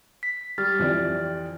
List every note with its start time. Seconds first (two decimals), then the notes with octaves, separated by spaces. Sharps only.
0.23 B6
0.58 G3 G4 F6 A6
0.79 F2 E3 D5